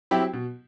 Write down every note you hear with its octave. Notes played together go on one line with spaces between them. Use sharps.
F#3 C4 E4 G4
B2